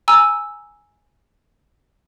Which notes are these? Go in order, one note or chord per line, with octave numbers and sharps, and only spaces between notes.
G#5 A#5 E6